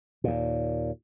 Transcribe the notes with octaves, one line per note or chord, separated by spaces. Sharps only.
D#2 A#2